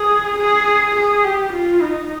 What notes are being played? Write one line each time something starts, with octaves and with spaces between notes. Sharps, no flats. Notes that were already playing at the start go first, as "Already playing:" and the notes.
Already playing: G#4
G#4
G#4
G4
F4
D#4